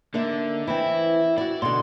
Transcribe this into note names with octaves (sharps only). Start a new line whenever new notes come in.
D3 A#3 D#4 E5
E3 C4 E4
E4 F#4 D5
B2 D3 C6